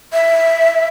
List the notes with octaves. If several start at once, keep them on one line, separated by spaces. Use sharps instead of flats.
E5